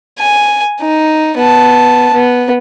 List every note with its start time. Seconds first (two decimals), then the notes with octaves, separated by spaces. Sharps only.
0.19 G#5
0.81 D#4
1.38 B3 A5
2.14 B3